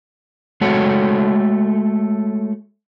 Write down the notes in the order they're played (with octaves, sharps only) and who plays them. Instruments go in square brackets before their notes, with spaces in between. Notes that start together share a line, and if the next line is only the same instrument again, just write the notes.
[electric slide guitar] G#3 A3 F#4 A4 C#5 F#5